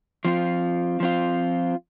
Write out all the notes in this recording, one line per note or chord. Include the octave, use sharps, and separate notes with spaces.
F3 C4 F4
F3 C4 F4